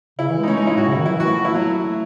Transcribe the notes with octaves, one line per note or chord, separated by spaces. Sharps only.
C#3 E4
E3
G#3
D#4
A3 C#4
D#4
G#3
E4
A2 F#4
C#3
E4
D#3
F#3 E4
E3 F#4
A3
F#4
E4
F#3